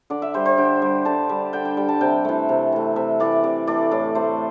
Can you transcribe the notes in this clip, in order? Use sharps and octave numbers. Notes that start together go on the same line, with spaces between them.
D3 D5
E5
G3 C5
C5
D3 G5
G3
D3 A5
G3
D3 G5
G5
G3 G5
A5
C3 G5
E3 A3
C3
E3 A3
C3 E5
E3 A3 D5
C3 D5
E3 A3 D5
A2 D5
A3 C5